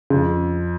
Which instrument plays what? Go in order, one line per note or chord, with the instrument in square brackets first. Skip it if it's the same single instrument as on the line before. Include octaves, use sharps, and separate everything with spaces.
[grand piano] F2 [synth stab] C#3